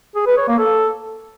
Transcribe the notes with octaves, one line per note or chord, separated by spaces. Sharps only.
G#4
B4
C#5
A#3
A4